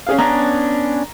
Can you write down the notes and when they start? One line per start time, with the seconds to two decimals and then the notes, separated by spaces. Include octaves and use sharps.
0.07 C#4 G#4 F5
0.19 B3 C#4 D4 A#5